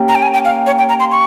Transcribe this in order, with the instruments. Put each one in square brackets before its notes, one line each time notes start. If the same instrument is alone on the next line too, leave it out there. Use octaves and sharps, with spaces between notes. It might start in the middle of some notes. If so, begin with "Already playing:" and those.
Already playing: [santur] A#3 C#4 G4 A#4
[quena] A#5
G5
G#5
G5
F5
C#5
G5
A#5
C6
C#6